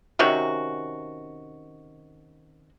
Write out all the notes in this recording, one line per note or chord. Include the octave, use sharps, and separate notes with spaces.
C3 D#3 C#4 F#4